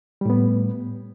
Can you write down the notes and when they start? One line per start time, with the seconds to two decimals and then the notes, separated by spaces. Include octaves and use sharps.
0.21 G3
0.25 A2
0.30 B3